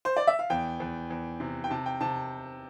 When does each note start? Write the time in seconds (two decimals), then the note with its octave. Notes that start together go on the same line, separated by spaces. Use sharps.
0.05 C5
0.17 D5
0.27 E5
0.39 F5
0.50 E2 G5
0.80 E2
1.10 E2
1.40 C3
1.64 G5
1.70 C3 A5
1.86 G5
2.01 C3 A5